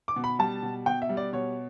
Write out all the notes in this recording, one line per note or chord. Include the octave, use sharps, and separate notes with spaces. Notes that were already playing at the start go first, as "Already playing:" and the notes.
D6
B2
B5
G3 A5
B2
B2 G5
E5
G3
D5
B2 C#5